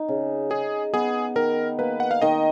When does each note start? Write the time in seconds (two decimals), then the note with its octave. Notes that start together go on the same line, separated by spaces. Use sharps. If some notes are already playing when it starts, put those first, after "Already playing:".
Already playing: D#4
0.08 C#3
0.50 D#4 G#4
0.94 B3 G#4
1.35 D#3 A#4
1.79 A#3 B4
2.00 F#5
2.11 F5
2.22 D#3 D#5